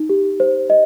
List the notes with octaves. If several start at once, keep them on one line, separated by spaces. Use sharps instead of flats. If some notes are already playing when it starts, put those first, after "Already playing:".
Already playing: D#4
G4
C5
D#5